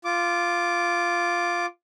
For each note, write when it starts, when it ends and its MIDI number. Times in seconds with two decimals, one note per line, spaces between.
0.05 1.66 65
0.05 1.66 86